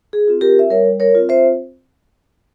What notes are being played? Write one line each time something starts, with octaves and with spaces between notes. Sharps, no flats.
G#4
C4 F4
G4 A#4
E5
G3 A#4 C#5
A#4 C#5
C4 F4
C5 E5